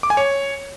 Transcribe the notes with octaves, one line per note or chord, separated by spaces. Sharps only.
D6
G#5
C#5